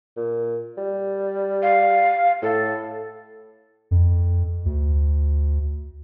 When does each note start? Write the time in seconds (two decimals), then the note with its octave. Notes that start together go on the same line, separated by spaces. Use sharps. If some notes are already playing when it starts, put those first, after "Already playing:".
0.17 A#2
0.77 G3
1.62 F5
2.42 A2 A4
3.91 F2
4.65 D2